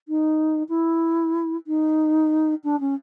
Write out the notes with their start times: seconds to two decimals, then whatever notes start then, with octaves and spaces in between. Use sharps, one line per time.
0.08 D#4
0.69 E4
1.67 D#4
2.64 D4
2.80 C#4